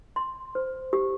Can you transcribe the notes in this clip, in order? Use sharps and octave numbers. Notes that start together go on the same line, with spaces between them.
C6
C5
G4